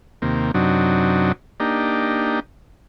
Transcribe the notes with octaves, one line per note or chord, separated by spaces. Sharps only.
D#2 C3 A#3
F#2 C3 F#3 D4 D#4
A#3 D4 D#4 G4